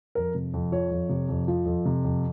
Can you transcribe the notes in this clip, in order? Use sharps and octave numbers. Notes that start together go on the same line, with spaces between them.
F2 A#4
C3
F2
F3 C#5
F2
C3
F2
F3
F2
C3
F2